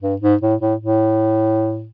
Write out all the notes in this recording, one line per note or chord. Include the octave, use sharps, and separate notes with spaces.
G2
G#2
A2
A2
A2